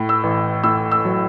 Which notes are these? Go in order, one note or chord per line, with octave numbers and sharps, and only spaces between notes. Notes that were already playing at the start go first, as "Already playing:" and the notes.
Already playing: A2
E6
A1
A2 E6
E6
F#3